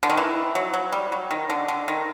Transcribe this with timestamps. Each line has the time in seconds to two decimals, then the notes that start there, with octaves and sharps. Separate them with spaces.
0.03 D3
0.10 D#3
0.17 E3
0.55 F#3
0.74 F#3
0.92 G3
1.12 F#3
1.31 D#3
1.50 D3
1.68 D3
1.88 D#3